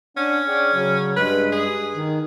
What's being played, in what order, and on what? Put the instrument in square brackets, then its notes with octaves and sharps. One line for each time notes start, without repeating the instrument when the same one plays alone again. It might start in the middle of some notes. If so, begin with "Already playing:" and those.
[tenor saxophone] C#4 [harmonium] D4 F#5
[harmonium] G#4 D5 G5
C#3 F#3
[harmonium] G2 G#3 [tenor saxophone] B4
[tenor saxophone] G#4
[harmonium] D#3